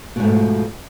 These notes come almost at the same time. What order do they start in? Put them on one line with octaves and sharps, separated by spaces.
B2 G#2 A3 D#3 F3